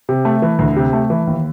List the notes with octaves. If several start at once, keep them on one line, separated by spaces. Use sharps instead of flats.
C3
A3
E3
D2
C3
A3
E3
D#2